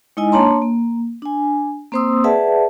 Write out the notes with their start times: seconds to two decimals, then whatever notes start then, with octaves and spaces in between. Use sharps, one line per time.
0.17 G#3 D#4 E4 D#5 G#5
0.32 A#3 D4 C#5 A5 A#5 C6
0.62 A#3
1.22 D4 G#5
1.92 A#3 C4 C5 C6 D#6 E6
2.24 G#4 B4 D5 E5 F#5 A5